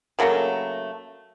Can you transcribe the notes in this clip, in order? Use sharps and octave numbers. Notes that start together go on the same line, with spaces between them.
C#3 F#3 A3 A#3